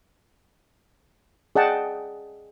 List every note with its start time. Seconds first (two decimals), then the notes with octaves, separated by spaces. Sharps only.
1.56 G#4 D5 D#5 F#5 G5 A5